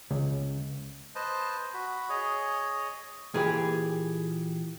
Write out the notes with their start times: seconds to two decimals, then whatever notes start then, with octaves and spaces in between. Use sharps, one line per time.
0.11 C#2
1.15 B4 C5 D#5 A5
1.74 F#4 B5
2.09 G#4 C#5 D#5
3.34 A#2 E3 G4 G#4